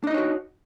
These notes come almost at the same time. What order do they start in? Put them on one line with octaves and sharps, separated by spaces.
D4 D#5 D#4 C#5 F#4